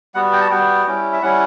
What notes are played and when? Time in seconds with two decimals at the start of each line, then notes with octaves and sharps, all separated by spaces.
0.15 G3 B3 F#4 F#5
0.33 G5
0.41 A5
0.50 G3 B3 F#4 G5
0.87 G3 C#4 E4
1.13 E5
1.22 G3 C#4 E4 F#5